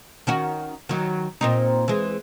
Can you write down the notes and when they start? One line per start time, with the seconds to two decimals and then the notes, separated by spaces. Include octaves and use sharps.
0.27 D#3 C#4 F#4
0.89 D#3 F#3
1.41 A#2 C4 D#4
1.88 E3 G#3